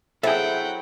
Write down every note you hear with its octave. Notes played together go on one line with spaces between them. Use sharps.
F#3 C4 E4 G#4 A4 E5 F#5 G5